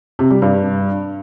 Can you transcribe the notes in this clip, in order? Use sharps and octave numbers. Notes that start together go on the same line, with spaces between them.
C3
G3
G2